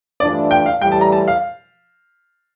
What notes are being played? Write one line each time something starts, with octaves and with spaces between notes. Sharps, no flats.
G2 E3 A3 D4 F4 D5
G5
F5
A2 E3 G3 G5
A5
A#5
A5
F5